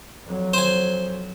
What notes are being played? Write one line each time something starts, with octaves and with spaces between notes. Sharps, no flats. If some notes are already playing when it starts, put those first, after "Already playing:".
F2 F#3
C5 G#5